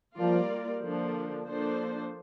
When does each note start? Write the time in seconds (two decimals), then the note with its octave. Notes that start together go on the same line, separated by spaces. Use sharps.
0.17 F3 G3 A#3 F4 A#4 D5
0.83 D3 F3 A#3 D4
1.47 F3 A#3 D4 A4 C5